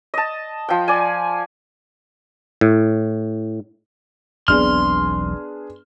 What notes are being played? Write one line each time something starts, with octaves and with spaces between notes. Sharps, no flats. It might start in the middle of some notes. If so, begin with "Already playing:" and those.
D#5 A5
F3 G5
D5 G#5
A2
E1 B1 B3 C4 D4 G#4 C6 F6